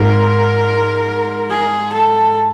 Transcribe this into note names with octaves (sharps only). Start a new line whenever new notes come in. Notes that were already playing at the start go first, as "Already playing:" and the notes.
Already playing: G#2 A#4
G#4
A4